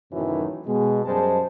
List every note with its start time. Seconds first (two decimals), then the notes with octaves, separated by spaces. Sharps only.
0.12 F#2 A2 C3 D#3 E3 F#3
0.66 B2 G#3
1.04 F#2 G3 G#3 C5 A5